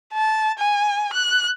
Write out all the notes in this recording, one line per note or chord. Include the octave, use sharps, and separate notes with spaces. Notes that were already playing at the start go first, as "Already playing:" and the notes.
A5
G#5
F#6